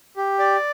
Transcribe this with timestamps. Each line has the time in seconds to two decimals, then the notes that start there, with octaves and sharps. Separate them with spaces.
0.17 G4
0.39 D5